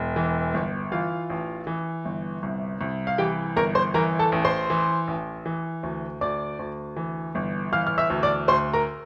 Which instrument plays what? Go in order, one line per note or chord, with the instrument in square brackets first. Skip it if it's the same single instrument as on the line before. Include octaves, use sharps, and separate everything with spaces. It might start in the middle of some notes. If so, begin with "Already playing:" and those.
Already playing: [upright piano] E1
E3
G1
E3 F4 F5
A1
E3
G1
C2
C2
F5
E3 G4 G5
G1 A#4 A#5
C5 C6
E3 A#4 A#5
A4 A5
A1
C5 C6
E3
A1
E3
D2
D2 D5 D6
D2
E3
G1
E3 F5 F6
F6
E5 E6
D2
D5 D6
D2 C5 C6
A#4 A#5